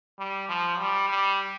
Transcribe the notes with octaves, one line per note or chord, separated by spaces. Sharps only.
G3
F3
G3
G3